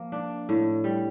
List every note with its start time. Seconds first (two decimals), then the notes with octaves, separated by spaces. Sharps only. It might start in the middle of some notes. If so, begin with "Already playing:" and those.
Already playing: F3 A#3
0.12 D4
0.49 A2
0.84 G3